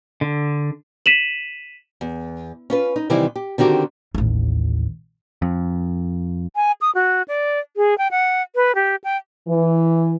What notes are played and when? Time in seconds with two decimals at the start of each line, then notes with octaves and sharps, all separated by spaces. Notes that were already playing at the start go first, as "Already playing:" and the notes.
0.21 D3
1.06 B6 D#7 E7 F#7
2.01 E2
2.70 C#4 F4 B4
2.96 D#4
3.10 C3 D#3 E3 G3 C4 E4
3.36 G4
3.58 D3 D#3 C4 F#4 G4
4.15 A1 D#2
5.42 F2
6.56 G#5
6.81 D#6
6.95 F#4
7.28 D5
7.77 G#4
7.98 G5
8.11 F#5
8.55 B4
8.75 G4
9.04 G5
9.48 E3